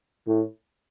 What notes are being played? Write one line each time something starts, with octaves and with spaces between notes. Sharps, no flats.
A2